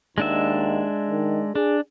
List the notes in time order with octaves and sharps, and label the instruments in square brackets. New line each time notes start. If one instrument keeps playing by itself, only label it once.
[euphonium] D#2 [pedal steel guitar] G#3 D4 E5
[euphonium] D#3
[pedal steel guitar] D4 [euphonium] G#4